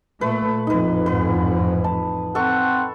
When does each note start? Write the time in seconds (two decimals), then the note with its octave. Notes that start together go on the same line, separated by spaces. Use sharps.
0.21 A#2 A3 B4
0.67 A1 F2 D#4 B4
1.06 G#2 B4
1.84 A5
2.35 C4 A4 F#5 C#6